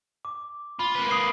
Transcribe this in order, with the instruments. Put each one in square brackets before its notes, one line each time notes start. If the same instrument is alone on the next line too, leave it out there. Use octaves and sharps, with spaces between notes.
[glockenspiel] D6
[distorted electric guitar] F4 [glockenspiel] B5
[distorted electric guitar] A#3 B4
[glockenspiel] D#6 C7 D7